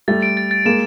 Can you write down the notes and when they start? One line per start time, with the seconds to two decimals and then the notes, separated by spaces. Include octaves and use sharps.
0.08 G3 A3 A6
0.22 D7
0.37 A6
0.51 A6
0.65 G#3 A#3 E7